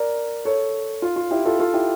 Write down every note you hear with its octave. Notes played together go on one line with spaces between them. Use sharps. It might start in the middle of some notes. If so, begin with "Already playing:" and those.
Already playing: A#4 D5
A4 C#5
F4
F4
E4 G4
F4 A4
F4 A4
E4 G4